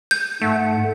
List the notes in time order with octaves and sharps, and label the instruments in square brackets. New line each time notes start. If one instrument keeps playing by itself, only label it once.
[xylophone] G6
[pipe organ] G#2 F#5 [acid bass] A3